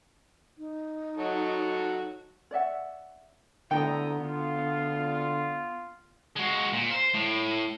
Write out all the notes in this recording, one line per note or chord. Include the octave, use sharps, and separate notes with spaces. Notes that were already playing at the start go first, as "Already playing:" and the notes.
D#4
F#3 F#4 A4
C#5 D5 E5 F#5
D3 B3 E4 G5 A#5 D#6
D3 F4
G#3 F#4
A#2
C5
A2